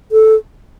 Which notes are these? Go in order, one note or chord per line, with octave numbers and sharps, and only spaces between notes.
A4